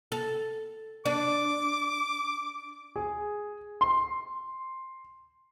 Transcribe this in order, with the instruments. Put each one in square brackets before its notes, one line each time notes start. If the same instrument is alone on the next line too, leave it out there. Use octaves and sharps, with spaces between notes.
[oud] A4
[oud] D4 [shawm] D6
[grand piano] G#4
C6